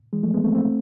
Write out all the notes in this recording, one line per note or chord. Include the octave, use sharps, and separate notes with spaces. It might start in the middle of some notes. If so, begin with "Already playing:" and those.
E3 G#3
F3 A3
G#3 B3
A3 C4
A3 C4